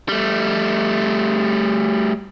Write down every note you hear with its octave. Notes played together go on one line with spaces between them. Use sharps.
G3 A3